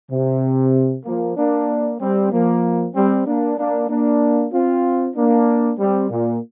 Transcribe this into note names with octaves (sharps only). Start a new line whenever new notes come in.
C3
F3 A#3
A#3 D4
G3 C4
F3 A#3
G3 C4
A#3 D4
A#3 D4
A#3 D4
C4 F4
A#3 D4
G3 C4
A#2